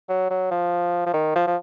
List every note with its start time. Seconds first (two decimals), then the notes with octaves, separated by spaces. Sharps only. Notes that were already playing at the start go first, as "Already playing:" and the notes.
0.09 F#3
0.31 F#3
0.51 F3
1.07 F3
1.14 D#3
1.36 F3
1.47 F3